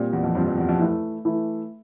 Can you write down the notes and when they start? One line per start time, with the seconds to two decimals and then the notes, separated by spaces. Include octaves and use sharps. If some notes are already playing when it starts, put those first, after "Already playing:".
Already playing: A#2 G3 C4 F4
0.13 E2
0.24 F2
0.35 G2 G3 C4 F4
0.46 F2
0.57 E2
0.69 F2
0.79 E3 A3 E4
1.25 E3 A3 E4